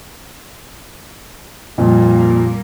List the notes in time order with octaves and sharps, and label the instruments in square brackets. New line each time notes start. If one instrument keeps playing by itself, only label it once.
[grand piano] F2 A#2 [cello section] G3 A#3